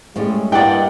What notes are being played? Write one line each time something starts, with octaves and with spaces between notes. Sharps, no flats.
A2 G3 G#3 C#4
G2 A#3 E4 A#4 D5 D#5 F#5 G5